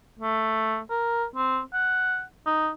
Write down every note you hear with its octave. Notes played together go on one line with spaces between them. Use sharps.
A3
A#4
C4
F#5
D#4